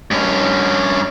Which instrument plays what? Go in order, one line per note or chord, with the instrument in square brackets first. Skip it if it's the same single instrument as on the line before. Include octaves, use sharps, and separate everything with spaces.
[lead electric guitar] G2 C#4